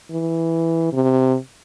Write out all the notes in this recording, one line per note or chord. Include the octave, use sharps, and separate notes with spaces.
E3
C3